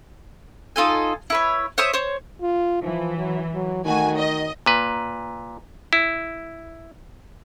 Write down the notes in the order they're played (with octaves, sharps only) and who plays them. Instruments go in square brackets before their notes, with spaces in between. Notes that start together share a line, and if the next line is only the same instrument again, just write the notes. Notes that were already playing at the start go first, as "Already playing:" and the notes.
[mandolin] D#4 F4 A4 G#5
E4 B4 C#5
C5 C#5 E5 D#6
C5 C#5
[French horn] F4
[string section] E3 [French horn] F3
[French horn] F#3
F#3
[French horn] D#3 [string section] A3 F#4 G#5
[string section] D#5
[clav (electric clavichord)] A#2 B4
E4